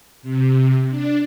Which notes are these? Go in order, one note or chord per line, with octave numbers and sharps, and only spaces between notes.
C3
D4